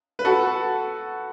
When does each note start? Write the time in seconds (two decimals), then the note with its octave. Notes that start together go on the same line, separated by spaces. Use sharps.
0.19 B4
0.25 F#4 A4